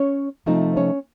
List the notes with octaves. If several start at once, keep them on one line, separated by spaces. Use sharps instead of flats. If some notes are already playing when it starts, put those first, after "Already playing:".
Already playing: C#4 C#5
C3 F3 A3 C4 D#4
C#4 C#5